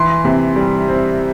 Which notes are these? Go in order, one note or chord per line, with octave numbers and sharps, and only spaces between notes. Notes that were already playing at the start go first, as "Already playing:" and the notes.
Already playing: E3 C6
C3
G3
C4